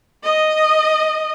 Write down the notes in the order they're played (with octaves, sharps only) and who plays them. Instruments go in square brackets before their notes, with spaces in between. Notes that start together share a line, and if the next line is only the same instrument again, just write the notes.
[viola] D#5